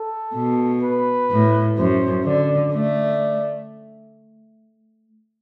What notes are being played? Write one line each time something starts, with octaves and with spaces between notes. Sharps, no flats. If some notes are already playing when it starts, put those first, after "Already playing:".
Already playing: A4
B2
B4
A2
F#2 C5
D3 D5
A3 D5